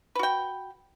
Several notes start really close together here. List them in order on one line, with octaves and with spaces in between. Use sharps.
B4 F#4 G5